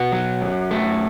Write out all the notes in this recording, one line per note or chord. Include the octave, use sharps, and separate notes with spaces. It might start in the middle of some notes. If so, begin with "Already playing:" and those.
Already playing: B2 F#4
F#3
F#2
A3